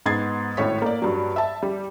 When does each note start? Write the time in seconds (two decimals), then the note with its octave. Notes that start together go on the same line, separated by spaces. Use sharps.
0.06 G#2 B3 D#5 G#6 A6 C7
0.57 G#1 A2 C#5 B6
0.82 A#3 D5
1.02 G2 F#3
1.36 E5 A5
1.63 G3